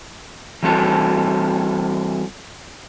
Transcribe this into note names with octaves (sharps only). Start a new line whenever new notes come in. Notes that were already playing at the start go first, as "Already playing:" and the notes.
E3 G3 C4 F#4 A4